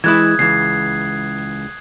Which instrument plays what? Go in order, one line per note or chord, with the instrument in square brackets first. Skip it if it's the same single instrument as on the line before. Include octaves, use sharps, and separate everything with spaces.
[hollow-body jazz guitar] E3 G#3 E4 [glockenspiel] D#6 F#6 G#6
[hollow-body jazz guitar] C#2 E3 [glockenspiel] G#6 C7